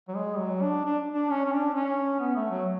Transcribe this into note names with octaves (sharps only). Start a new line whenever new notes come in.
F#3
G#3
F#3
D4
D4
D4
C#4
C#4
D4
C#4
B3
A3
F#3